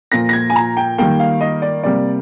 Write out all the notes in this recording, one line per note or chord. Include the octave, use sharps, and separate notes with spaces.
A#2 F3 A#3 A#6
A#6
G#6
G#5
A#5
G5
D#3 G3 A#3 G5
F5
D#5
D5
C3 G3 A#3 D5